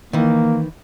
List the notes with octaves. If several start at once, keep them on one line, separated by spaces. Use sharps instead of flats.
D#3 E3 A#3